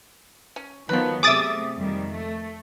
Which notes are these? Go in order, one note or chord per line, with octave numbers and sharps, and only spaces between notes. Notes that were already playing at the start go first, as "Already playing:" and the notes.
C#4
D#3 F3 F#3 B3 B4
C3 A3 G#4 D5 E5 D6 D#6 A6
F2 D#3 G3
A3